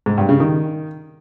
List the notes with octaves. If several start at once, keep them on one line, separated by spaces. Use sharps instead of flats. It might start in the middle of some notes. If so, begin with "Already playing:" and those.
G#2
G2
C#3
D#3